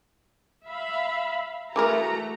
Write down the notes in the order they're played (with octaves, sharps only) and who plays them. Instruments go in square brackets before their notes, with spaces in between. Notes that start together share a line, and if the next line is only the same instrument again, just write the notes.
[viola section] E5 F5 B5
[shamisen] E3 G#4 A#4 [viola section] A3 F#4 A#5